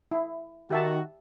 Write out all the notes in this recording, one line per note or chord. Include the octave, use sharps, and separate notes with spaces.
E4
D#3 F#4 G4 E5 A5